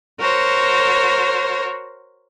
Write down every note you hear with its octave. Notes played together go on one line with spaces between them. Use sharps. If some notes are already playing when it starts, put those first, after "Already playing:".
F#4 A#4 C5 C#5